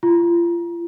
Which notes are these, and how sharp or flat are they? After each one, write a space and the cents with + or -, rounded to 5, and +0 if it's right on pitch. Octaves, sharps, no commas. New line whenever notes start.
F4 -35